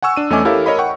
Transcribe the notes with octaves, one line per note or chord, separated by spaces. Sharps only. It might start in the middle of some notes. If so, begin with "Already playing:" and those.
F#5 G#5 C#6 E6
D4 D#7
E2 A3 C#4 D#5 G#5 D6
E4 G4 A4 A#4 C#5 F5
A#4 C#5 D#5 B5
F#5 G5 C#6